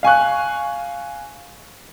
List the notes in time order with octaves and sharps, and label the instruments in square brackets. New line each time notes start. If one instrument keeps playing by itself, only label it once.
[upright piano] F5 G#5 C#6 F#6